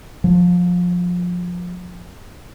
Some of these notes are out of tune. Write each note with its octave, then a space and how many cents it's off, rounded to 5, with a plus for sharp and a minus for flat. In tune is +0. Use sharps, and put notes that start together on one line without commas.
F3 +25